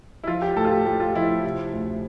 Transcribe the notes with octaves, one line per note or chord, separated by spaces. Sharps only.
E4
F3 F4
G4
A2 A4
F4
G4
A2 G4
F4
F3 E4
C3
D2